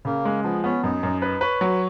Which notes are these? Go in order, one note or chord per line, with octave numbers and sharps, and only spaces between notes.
C#3 A#3
G#3
F3 B3
B3 C#4
F#2 D#4
F#2
D#4 B4
B4 C#5
F#3